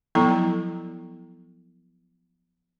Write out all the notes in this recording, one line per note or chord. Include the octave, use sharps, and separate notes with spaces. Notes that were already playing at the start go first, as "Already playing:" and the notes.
F3 F#3 B3 E4 A4 A#5